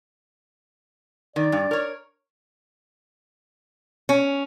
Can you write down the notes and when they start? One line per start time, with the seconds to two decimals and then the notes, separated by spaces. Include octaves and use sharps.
1.36 D#3 D5
1.52 G2
1.71 A#4 C#5
4.09 C#4